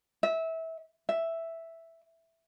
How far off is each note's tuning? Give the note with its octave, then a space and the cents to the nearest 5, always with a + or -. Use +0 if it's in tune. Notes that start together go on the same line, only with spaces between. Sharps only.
E5 -20
E5 +0